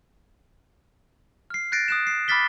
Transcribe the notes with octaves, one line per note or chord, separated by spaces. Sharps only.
F6 C7
F#6 G6 A6 A#6 C7 D7
D#6 F#6 E7
C7
B5 D6 F6 A6 B6 G7